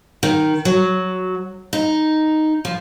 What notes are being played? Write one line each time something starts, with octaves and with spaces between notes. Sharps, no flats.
D#3
F#3
D#4
F3